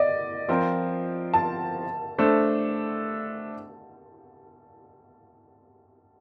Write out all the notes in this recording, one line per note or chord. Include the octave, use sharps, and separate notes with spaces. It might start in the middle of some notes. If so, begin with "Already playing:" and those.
Already playing: D5 D#5
F3 C4 F4 A#4
A5
A3 D4 A4 C5